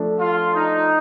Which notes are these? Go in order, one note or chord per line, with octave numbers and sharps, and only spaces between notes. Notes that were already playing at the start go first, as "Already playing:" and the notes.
Already playing: F3 A3 D4
F4
D#4